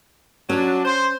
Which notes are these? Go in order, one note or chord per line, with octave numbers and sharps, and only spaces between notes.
F#3 C#4 D4
C5